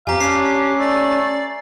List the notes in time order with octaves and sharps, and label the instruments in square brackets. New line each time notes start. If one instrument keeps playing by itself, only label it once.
[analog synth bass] F2 [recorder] G4 [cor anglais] F5 [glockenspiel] G#5 A#5
[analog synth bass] C#4 [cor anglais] D4 [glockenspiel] C7
[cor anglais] A3 [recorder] D5